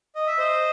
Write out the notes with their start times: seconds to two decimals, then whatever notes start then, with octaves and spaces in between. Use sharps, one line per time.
0.15 D#5
0.27 E5
0.38 C5 D#5